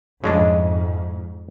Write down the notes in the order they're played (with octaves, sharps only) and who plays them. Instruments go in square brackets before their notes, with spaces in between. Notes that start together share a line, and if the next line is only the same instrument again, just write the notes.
[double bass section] F2 G#2 [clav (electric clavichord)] C#3 G#3 D4 [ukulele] E4 D#5